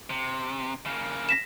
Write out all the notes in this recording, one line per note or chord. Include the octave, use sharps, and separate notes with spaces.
C3
C#3 A#3
A#6 B6 E7